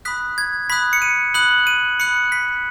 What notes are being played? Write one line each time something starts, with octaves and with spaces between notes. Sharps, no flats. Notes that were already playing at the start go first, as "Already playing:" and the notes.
B5 D#6 F#6 B6
G#6
B5 D#6 F#6 B6
C#7
D#7
B5 D#6 F#6 F#7
D#7
B5 D#6 F#6 C#7
B6